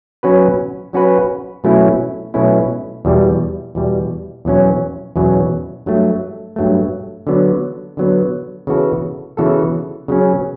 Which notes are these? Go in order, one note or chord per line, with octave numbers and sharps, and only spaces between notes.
F#3 C#4 F#4 B4
F#3 C#4 F#4 B4
B2 F#3 A3 C#4 E4
B2 F#3 A3 C#4 E4
E2 B2 G3
E2 B2 G3
E2 B2 F#3 C#4
E2 B2 F#3 C#4
G2 F#3 A3
G2 F#3 A3
D3 F#3 B3
D3 F#3 B3
C#3 E3 B3 F#4 A4
C#3 E3 B3 F#4 A4
C#3 F#3 C#4